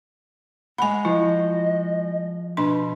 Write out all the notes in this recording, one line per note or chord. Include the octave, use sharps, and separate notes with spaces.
G#3 F#5 G#5 B5
F3 E4 D#5
B2 D4 C6